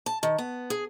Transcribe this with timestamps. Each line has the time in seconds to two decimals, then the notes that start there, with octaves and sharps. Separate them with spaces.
0.06 A5
0.23 D#3
0.38 B3
0.70 G#4